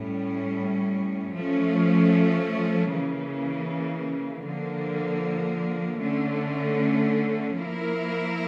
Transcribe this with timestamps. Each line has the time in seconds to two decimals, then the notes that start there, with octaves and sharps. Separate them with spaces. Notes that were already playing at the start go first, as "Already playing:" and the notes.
Already playing: A2 G3 C#4
1.35 F3 A3 C#4
2.91 C#3 E3 A#3
4.45 D3 F3 A#3
6.01 D3 A3 C#4
7.57 F3 A#3 E4 A#4